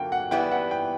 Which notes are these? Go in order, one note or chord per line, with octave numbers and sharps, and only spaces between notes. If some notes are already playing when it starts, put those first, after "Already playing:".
Already playing: D3 F#3 A#3 G5
F#5
E3 G3 B3 E4 G5
F#5
G5